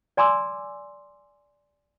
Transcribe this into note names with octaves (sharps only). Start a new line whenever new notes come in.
D5 G#5 A#5 C6 D6 E6